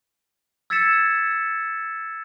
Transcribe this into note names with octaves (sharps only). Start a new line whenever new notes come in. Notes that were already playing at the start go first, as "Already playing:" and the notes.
E6 G#6 A6 B6 C#7 E7